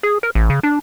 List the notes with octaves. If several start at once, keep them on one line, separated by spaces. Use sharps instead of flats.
G#4
A#4
A1
C#3
D4